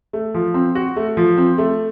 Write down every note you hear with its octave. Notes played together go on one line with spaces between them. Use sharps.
A3
F3
C4
F#4
A3
F3
C4
A3